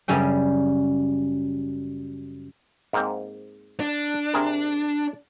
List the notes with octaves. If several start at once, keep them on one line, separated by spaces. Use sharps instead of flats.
F#2 C#3 G3 C#4 G5
G#2 A#3 C4
D4
C3 G#4 A#4